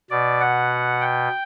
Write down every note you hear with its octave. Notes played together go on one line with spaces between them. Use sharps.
B2 D5
F#5
G5